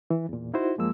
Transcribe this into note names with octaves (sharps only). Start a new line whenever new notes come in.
E3
E2 A#2
D#4 E4 F#4 C5
F#2 F3 G#3 A#3 E6